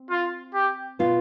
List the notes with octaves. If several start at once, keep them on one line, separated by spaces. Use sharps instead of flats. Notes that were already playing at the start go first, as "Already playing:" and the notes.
Already playing: C4
F4
G4
B2 B3 F4